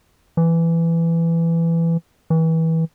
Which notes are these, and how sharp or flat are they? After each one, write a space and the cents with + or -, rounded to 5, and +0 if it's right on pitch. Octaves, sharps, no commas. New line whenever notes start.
E3 +15
E3 -25